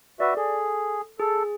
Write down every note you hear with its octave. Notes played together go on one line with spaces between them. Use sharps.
F#4 B4 D5 E5
G#4 A4
G#4 A4